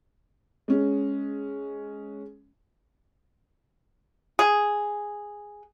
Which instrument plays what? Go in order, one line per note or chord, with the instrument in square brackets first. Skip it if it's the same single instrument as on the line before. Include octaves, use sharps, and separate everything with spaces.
[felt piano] G#3 C#4
[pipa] G#4